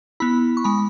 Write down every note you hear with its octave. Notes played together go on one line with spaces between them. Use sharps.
B3 E4 B5
C#6
G#3 B5